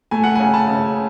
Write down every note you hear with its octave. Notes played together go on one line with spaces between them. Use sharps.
A3 G#5
F#5
C#3 G#5
A5
C#3